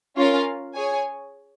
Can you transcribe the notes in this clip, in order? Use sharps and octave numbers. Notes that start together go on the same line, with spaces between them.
C#4 F4 A#4 F5
G#4 C#5 G#5